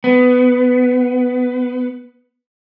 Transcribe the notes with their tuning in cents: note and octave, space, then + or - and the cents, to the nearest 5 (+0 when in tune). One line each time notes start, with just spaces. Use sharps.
B3 +15